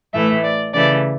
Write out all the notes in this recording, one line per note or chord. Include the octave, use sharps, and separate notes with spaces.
A2 E3 A3 E5
D5
C#3 E3 A3 D5